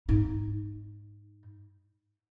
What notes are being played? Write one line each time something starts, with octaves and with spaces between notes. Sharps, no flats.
G#2 D#4